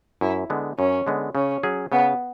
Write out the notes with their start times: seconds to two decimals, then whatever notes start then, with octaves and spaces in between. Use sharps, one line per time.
0.21 F#2 E4
0.50 D3 G#3 B3
0.78 F#2 C#4
1.07 D3 G#3 B3
1.35 C#3 C#4
1.63 F#3 C#4 G#4
1.92 C#3 B3